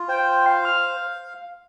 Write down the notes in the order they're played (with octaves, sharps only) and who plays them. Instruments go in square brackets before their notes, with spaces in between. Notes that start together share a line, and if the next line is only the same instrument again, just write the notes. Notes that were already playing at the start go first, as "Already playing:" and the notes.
Already playing: [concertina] F4
[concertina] C5 [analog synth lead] G5
[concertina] F5 [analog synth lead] C6
[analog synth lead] F6